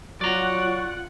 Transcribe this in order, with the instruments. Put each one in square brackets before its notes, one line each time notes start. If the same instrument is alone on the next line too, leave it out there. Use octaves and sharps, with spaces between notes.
[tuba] F#3 [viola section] F4 F#5 [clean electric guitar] D5 A#5 [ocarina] C#6